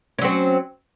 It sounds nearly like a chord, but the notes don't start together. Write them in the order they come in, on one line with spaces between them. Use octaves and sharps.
C#4 F#3 C4